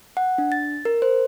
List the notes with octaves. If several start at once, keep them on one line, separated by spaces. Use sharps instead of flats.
F#5
D4
A6
A#4
C5